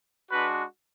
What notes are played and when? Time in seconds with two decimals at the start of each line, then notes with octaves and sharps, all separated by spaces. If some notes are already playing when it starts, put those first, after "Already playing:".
0.31 G#3 D4 F#4 B4